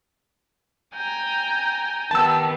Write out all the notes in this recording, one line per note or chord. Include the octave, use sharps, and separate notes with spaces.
G5 G#5 A#5
D#3 B3 G4 A5 E6